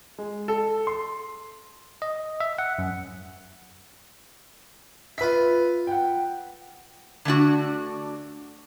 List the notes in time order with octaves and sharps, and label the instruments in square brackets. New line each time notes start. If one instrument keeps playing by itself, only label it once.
[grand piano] G#3
A4
C6
[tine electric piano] D#5
E5
F#5
F#2
[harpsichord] F4 E5 [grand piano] B4 B6
[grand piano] F#5 G5
[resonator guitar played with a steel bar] D3 A3 D4 F#4